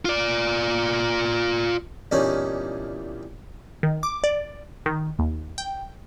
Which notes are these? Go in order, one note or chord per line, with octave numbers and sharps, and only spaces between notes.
F4 D5
E2 G2 A#2 C#4 D#4
D#3
D6
D5
D#3
D#2
G5